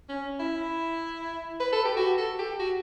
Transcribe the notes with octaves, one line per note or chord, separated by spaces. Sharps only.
C#4
E4
B4
A4
G4
F#4
A4
G4
F#4